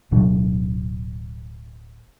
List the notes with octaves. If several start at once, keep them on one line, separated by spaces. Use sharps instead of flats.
D1 B2 F#3 D4